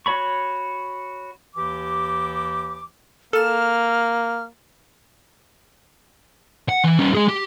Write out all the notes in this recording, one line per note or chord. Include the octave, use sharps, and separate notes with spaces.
F#4 C#5 B5 C#6
D#2 E3 G4 D6
A#3 A4 F6 E7
F#5
E3
G3 C#4
G#3 G#4
G4